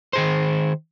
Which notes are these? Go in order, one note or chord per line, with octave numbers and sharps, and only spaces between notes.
D#3 G#4 C5